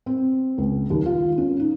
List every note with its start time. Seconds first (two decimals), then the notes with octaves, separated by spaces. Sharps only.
0.06 C4
0.58 C#2
0.90 D#2
1.06 F4
1.38 C#4
1.59 D#4